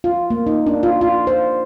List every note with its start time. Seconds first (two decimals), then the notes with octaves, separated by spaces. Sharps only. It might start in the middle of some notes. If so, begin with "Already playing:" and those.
0.04 F4
0.30 A#3
0.47 D#4
0.66 D4
0.83 F4
1.01 F4
1.27 C5